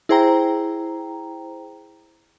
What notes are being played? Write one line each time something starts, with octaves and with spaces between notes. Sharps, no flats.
E4 G#4 C5 G5 A#5